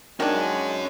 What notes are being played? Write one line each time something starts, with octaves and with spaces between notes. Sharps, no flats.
D#3 G#3 C#4 D4 F#4 G#5